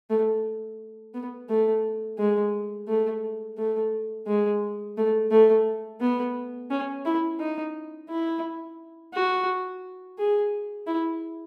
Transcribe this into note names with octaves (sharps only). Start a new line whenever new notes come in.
A3
B3
A3
G#3
A3
A3
G#3
A3
A3
B3
C#4
E4
D#4
E4
F#4
G#4
E4